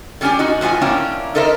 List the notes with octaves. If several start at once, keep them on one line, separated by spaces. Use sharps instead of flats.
D3 G3 C#4 D4 G4 G#5
D#4 F#4
A2 F3 F#4 G#5
A#3 C#4 D4 E4 G5
D#4 A4 A#4 C5 E5